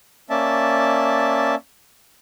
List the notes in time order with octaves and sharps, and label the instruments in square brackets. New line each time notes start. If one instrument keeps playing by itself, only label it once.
[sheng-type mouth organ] A#3 C#4 D5 E5 A5